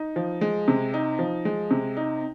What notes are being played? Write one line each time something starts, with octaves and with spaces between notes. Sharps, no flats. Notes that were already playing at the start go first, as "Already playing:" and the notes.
Already playing: D#4
F3
G#3
C3
D#4
F3
G#3
C3
D#4